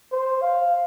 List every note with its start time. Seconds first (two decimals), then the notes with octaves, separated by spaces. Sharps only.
0.12 C5
0.42 F5